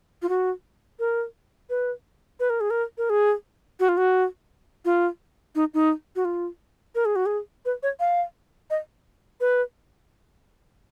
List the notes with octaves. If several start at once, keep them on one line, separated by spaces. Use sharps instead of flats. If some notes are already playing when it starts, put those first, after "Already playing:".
F4
F#4
A#4
B4
B4
A#4
G#4
A#4
A#4
G#4
F#4
F4
F#4
F4
D#4
D#4
F#4
F4
A#4
G#4
F#4
G#4
B4
C#5
F5
D#5
B4